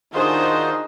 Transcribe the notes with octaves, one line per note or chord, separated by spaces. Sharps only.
D#3 D4 D#4 F4 F#4 G#4 C5